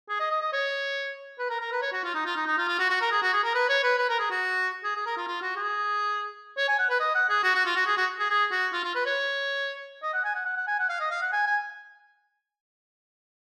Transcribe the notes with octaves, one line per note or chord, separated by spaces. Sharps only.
G#4
D#5
D#5
D#5
C#5
B4
A#4
A#4
B4
C#5
F#4
F4
D#4
F4
D#4
D#4
F4
F4
F#4
F#4
A#4
G#4
F#4
G#4
A#4
B4
C#5
B4
B4
A#4
G#4
F#4
G#4
G#4
A#4
F4
F4
F#4
G#4
C#5
G#5
F#5
B4
D#5
F#5
G#4
F#4
F#4
F4
F#4
G#4
F#4
G#4
G#4
F#4
F4
F4
B4
C#5
D#5
F#5
G#5
F#5
F#5
F#5
G#5
F#5
F5
D#5
F5
F#5
G#5
G#5